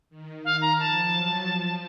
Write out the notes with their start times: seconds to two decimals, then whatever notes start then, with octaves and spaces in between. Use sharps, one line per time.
0.10 D#3
0.44 F5
0.61 A#5
0.78 F3 A5
1.13 F#3
1.47 F3